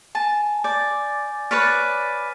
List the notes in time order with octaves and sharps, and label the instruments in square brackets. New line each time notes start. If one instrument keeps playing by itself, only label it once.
[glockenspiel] G#5 [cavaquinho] A5
[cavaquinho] D5 [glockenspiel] D6 G6 A6
[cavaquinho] B4 C#5 D5 [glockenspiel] F6 B6 D#7